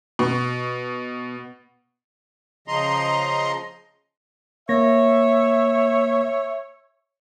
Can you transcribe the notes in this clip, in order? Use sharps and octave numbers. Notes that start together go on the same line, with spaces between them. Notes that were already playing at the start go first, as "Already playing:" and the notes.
B2
C#3 F3 D#5 A#5 C6
A#3 C#5 E5 A#6